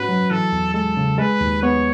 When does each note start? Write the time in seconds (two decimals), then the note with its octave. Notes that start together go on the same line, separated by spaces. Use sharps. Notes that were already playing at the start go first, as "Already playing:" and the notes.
Already playing: G#2 C#4 F#4 B4
0.09 F#3
0.30 E3 A4
0.52 E2
0.74 G#3 A4
0.97 C#3
1.18 G#3 B4
1.41 D#2
1.63 B3 C#5